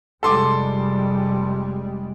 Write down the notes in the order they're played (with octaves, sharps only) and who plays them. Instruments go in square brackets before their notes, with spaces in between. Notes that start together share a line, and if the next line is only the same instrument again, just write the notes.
[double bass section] F1 G3 G#3 [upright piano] A4 C6 D6